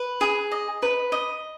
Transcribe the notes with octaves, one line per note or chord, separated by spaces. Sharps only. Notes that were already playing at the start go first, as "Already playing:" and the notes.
Already playing: B4
G#4
D#5
B4
D#5